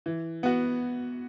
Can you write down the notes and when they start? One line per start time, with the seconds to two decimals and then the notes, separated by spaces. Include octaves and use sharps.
0.06 E3
0.43 B3 F#4